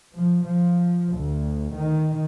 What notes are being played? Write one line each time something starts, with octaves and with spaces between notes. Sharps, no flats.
F3
F3
D2
D#3